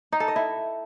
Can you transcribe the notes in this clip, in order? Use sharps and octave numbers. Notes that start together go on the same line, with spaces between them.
D#4
A4
D#5
E4